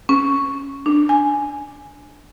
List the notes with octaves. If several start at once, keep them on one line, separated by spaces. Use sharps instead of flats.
C#4
D4
G#5